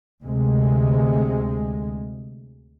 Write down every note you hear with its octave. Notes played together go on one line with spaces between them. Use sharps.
D2 C3 G#3